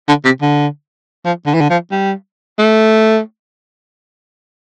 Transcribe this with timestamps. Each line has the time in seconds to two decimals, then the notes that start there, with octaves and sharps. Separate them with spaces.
0.08 D3
0.25 C3
0.42 D3
1.25 F3
1.47 D3
1.54 E3
1.61 D3
1.70 F3
1.91 G3
2.59 A3